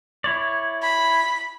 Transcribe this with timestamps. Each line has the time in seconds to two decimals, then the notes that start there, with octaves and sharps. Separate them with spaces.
0.24 E4 C#5 D5
0.82 B5